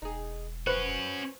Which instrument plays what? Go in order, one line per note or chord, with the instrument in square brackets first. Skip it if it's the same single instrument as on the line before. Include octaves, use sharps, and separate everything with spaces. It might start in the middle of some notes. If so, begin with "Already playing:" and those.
[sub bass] E1 [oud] D#4 G#4
[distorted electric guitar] C#4 F#4 [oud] B4 [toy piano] C5